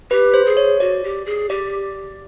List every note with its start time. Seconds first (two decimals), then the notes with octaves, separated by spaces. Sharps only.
0.11 G4 B4
0.34 C5
0.46 G#4
0.57 C#5
0.80 F#4 D5
1.04 G4
1.26 G#4
1.49 G4 D5